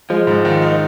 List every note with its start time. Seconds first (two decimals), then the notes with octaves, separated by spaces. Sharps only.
0.10 F3 G#3
0.27 G#2
0.45 D#3
0.62 D#4